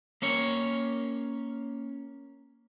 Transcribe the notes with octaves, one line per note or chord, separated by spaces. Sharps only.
A#3 C#4 C#5